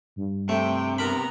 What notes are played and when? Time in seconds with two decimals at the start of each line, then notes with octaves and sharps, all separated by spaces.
0.16 G2
0.49 C3 A3 G5
0.98 B3 A#4 A#5 B5